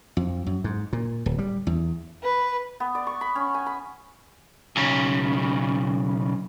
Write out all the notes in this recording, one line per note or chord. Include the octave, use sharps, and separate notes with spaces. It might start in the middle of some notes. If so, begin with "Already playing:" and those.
F2
F#2
G#2
A#2
D1
G3
E2
B4
B3
D5
C#6
B5
C#4
G#5
B5
B1 C#3